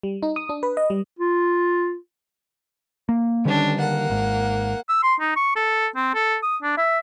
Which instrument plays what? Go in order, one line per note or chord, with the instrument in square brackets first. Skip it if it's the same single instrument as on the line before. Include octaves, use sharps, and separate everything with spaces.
[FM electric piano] G3
D#4
D#6
D4
B4
D#5
G3
[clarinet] F4
[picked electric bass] A#3
[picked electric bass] D3 D#3 G3 [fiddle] C#4 D4
[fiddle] A#3 F#5
[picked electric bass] G#1 G#2
[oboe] E6
C6
D#4
C#6
A4
C4
A4
D#6
D4
E5